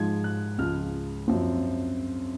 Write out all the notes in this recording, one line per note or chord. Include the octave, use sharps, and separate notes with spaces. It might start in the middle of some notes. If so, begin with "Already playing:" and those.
Already playing: G#2 F3 G#3 G#6
F#6
C#2 C#3 F3 F6
F#2 F3 C4